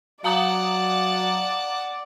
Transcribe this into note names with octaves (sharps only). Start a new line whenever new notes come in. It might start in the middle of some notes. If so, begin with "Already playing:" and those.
F#3 D5 F5 F#5 A5 A#5 D#6